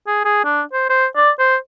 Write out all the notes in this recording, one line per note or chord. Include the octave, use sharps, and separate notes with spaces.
G#4
G#4
D4
C5
C5
D5
C5